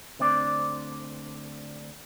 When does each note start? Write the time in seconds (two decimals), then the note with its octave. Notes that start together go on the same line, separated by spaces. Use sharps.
0.19 D2 C4 D4 D5